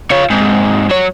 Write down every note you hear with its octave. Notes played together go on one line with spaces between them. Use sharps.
F4 C#5
G#2 C3
F#3 C#5